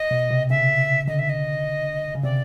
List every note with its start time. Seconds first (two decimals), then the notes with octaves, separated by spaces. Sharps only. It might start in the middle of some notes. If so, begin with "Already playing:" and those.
Already playing: D#5
0.11 B2
0.31 C3
0.50 C#3 E5
1.08 D3 D#5
1.19 E5
1.30 D#5
2.15 C#3
2.23 C3 D5